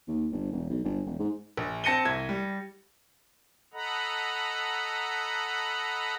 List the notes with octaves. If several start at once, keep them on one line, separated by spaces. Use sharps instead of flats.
D#2
G1
E1
B1
G1
E1
G#2
A#1
C4 A5 A#6 C#7 D#7 G7
C2 G#6
G3
A4 D#5 F#5 A#5 B5